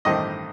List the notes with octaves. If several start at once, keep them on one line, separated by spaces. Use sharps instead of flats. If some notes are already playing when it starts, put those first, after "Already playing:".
A1 G2 D#3 A3 C4 D#5